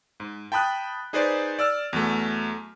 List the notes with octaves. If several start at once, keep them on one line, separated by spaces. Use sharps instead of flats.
G#2
G5 A5 B5 D#6 F#6
D#4 G#4 B4 C5 D5
D5 E6 F6
E2 F#3 A3